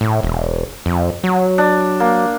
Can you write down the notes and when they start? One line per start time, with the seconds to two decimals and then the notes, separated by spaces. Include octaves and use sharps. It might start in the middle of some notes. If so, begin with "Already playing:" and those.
0.01 A2
0.23 E1
0.86 F2
1.24 F#3
1.58 D4
2.00 A#3